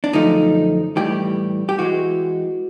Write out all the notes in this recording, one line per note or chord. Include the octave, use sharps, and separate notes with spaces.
D4
F#2 D3 F3 A3 D#4
A2 E3 G3 G4
G4
E3 G#3 F#4